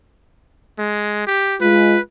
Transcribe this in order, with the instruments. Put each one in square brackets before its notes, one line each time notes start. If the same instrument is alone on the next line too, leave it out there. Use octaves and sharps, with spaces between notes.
[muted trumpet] G#3
G4
[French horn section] G#3 F4 [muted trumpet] B4